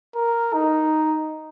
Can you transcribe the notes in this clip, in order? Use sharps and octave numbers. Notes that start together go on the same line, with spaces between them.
A#4
D#4